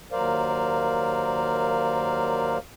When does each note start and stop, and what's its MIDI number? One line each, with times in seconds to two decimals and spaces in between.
0.12 2.58 39
0.12 2.58 54
0.12 2.58 70
0.12 2.58 72
0.12 2.58 74
0.12 2.58 77